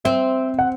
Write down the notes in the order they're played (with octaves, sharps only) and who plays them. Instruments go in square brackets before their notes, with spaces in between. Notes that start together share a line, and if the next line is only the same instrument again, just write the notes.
[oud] C4 [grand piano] E5
[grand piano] F#5